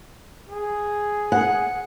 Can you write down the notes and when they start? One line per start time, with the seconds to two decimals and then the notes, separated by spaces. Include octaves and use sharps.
0.49 G#4
1.32 F#5